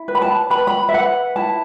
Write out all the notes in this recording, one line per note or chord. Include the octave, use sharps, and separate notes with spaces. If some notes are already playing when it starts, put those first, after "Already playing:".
Already playing: E4
B4
B5
A5
B4 B5
B5
E5
B4 F#5
E4 A5